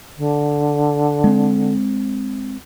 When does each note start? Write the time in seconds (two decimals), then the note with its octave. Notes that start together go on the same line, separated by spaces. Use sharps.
0.17 D3
1.24 G#3 C4